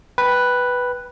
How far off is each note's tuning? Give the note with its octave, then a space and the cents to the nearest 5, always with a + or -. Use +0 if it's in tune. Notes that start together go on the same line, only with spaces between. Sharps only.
B4 +0 G5 +0